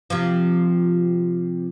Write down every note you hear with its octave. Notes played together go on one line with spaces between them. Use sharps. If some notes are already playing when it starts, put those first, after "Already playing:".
C3 F3